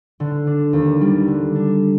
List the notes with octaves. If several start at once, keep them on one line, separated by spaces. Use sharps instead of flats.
D3
D4
D#2
G3
D3
D4